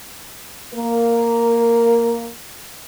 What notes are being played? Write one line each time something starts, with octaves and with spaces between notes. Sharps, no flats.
A#3 A#4